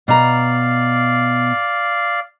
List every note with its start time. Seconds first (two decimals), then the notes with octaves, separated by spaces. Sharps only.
0.08 B2 D5 F5 A#5